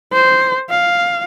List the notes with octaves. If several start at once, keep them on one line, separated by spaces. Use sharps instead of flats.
C5
F5